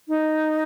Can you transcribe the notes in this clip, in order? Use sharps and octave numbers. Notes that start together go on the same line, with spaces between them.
D#4